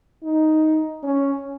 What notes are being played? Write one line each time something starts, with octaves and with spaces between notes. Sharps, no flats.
D#4
C#4